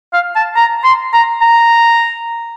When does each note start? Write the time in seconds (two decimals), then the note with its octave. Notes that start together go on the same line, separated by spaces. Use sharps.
0.14 F5
0.36 A5
0.56 A#5
0.84 C6
1.13 A#5
1.42 A#5